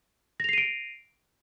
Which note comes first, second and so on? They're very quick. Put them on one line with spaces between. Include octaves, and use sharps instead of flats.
A#6 F7 C7 D#7 D7